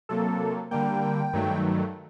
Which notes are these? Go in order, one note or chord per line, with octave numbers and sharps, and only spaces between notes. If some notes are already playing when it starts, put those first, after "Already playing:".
C3 F#3 A#3 A4
D3 G3 A#3 G5
G2 D#3 F#3 A3